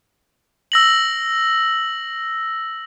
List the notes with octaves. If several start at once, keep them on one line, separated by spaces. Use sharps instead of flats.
E6 A#6 F#7